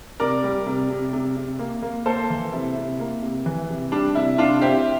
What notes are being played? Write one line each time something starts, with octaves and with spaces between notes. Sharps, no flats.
C3 A#4 D5
G3
C3
C3
C3
C3
A#3
A#3
A#3 A4 C5
E3
C3 E4
C3
A#3
C3
E3
C3
G3 D4
C3 E4
C3 D4 F4
C4 E4 G4